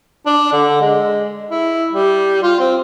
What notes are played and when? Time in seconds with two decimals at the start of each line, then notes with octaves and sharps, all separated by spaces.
0.26 D4
0.53 D3
0.81 G#3
1.51 E4
1.93 G3
2.43 F4
2.59 C4